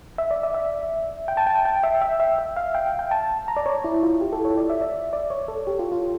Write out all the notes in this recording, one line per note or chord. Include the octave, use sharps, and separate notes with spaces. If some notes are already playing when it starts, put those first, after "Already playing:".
E5
D5
E5
E5
G5
A5
G5
A5
G5
E5
E5
E5
E5
F5
G5
G5
A5
A#5
D5
C#5
E4
F4
G4
A4
C#5
D5
E5
D5
D5
C#5
A4
G4
F4
F4